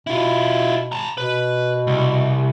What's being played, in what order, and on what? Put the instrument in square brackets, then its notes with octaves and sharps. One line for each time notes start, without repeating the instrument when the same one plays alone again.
[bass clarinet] B2 [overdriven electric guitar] E4 F4
[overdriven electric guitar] A5 A#5
[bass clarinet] B2 [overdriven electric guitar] B4
[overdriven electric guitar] C2